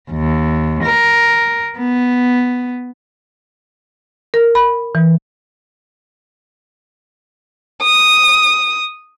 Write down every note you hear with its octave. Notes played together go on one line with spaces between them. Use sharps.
D#2
A#4
B3
A#4
B5
E3
D#6